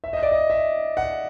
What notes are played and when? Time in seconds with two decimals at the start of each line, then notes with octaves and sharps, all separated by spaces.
0.04 E5
0.13 D#5
0.23 D5
0.32 D#5
0.50 E5
0.97 F#5